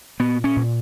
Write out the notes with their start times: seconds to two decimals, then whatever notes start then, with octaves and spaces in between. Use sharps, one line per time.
0.20 A#2 B3
0.44 C#4
0.56 A#2